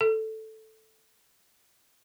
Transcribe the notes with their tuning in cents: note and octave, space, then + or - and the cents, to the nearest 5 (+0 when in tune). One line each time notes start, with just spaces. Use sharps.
A4 +0